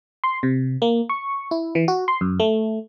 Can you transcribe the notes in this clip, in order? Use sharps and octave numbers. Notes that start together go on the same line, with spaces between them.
C6
C3
A#3
C#6
E4
E3
F#4
C6
F#2
A3